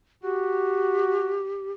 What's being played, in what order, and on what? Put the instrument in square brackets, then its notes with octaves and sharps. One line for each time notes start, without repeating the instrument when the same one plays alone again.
[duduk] F#4 [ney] G4